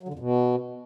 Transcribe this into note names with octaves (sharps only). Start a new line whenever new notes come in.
F#3
D3
F2
B2